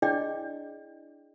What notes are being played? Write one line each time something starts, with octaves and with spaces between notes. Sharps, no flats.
D4 E4 G#4 D5 D#5 G5